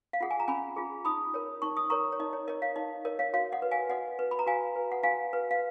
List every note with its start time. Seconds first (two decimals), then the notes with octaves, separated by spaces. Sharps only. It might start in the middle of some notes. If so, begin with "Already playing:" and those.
0.13 F5
0.21 F4 G#4 F#5
0.31 G#5
0.40 A#5
0.48 C#4 G#5 B5
0.76 F4 G#4
1.05 D#4 B5 D#6
1.34 A#4 C#5
1.62 D#4 C#6
1.77 D#6
1.90 A#4 C#5 A#5 C#6
2.12 C#5
2.20 D#4 D#5
2.33 C#5
2.47 A#4 C#5 D#5
2.62 C#5 F5
2.76 D#4 D#5
3.05 A#4 C#5 D#5
3.19 C#5 F5
3.33 F#4 C#5 F5
3.52 D#5 F#5
3.62 B4
3.71 F5 G#5
3.90 F#4 D#5 F#5
4.19 B4
4.31 B5
4.39 A#5
4.46 F#4 F5 G#5
4.76 B4
4.92 F#5
5.03 F#4 F5 G#5
5.33 B4
5.51 F5